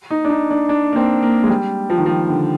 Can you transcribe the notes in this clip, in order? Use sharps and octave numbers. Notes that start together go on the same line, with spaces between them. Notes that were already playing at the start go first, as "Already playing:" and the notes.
D#4
D4
D#4
D4
D4
A#3
C4
A#3
G#3
G3
F3
D#3
F3
D3